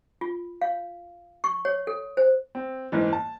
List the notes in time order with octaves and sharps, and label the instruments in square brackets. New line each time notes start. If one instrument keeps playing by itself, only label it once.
[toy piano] F4
F5
C#6
C#5
A4
C5
[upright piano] C4
F#1 G#2 E3
A5